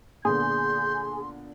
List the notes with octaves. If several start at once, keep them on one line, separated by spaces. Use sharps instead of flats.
A#2 D3 B3 G#4 C6 G6